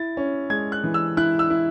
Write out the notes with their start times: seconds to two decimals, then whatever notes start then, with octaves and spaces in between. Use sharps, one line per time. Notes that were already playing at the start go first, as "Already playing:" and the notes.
Already playing: E4 A6
0.17 C#4
0.50 G#3 G#6
0.72 F#6
0.84 E3
0.94 E6
1.17 E4 F#6
1.39 E6
1.50 E4